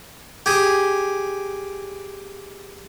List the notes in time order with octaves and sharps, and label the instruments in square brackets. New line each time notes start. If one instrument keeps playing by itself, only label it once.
[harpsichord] G4 G#4